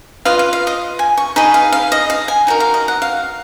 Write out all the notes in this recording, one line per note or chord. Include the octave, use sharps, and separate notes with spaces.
F4 B4 D#5 F5
F5
F5
D#5
G#5
C#6
D#4 G#4 B4 D#5 B5
F5
F5
D#5
F5
G#5
D#4 F#4 A#4
F5
D#5
F#5
F5